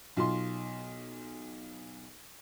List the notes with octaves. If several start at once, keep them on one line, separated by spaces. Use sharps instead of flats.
B1 F4 C6